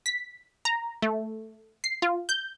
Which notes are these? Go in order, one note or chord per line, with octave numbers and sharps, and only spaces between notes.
B6
A#5
A3
C7
F4
G6